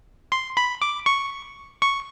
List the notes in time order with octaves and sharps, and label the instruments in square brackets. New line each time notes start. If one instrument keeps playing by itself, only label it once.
[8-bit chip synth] C6
B5
D6
C#6
C#6